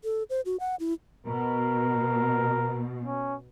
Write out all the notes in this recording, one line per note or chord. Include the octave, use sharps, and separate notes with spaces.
A4
C5
F#4
F#5
E4
B2 A#4
C#4